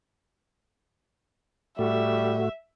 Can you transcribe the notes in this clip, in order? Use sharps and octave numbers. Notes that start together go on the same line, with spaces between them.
A2 G3 A3 F#4 E5